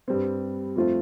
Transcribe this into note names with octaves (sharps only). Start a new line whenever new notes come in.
G2 G3 C4
F2 F3 A3 C4 F4